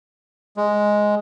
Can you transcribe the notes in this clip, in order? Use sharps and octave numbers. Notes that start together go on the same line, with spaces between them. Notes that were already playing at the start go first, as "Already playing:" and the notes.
G#3